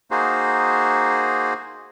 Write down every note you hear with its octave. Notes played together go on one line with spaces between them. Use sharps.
A#3 D#4 F#4 G#4 C5